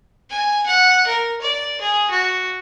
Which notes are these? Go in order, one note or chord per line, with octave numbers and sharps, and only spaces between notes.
G#5
F#5
A#4
D5
G#4
F#4